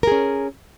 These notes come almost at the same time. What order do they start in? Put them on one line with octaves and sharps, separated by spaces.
A#4 G#4 C#4